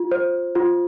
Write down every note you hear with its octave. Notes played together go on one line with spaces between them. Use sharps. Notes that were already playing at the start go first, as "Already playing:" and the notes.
Already playing: F4
C5
F4